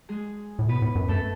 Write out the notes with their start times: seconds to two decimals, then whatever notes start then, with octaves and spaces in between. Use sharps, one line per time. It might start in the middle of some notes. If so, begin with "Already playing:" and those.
0.09 G#3 G#4
0.59 A2
0.68 B2 B3 B4
0.82 A2
0.95 F#2
1.08 F#2 A3 A4